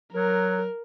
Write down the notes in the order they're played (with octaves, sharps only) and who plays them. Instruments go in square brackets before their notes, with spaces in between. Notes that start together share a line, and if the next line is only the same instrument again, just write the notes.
[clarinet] F#3 [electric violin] A#4